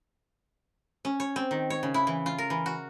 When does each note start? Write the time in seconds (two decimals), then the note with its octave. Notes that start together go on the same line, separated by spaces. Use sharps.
1.05 C#4
1.20 C#5
1.36 C4
1.51 D#3
1.70 C#5
1.83 C#3
1.94 E4
2.07 E3
2.26 F4
2.38 A#4
2.50 E3
2.66 F#4